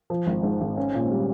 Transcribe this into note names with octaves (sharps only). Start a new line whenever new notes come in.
F3
G#1
G#2
G#1
C#4
A#2
G3